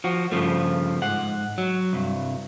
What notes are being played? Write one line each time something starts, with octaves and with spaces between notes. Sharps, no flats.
F3 F#4
G2 C#3 F3 A3
G#2 F#5
F#3
C2 G2